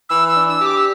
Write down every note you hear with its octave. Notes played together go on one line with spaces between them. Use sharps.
E3 E6
E6
D4
E6
G4
D6
E6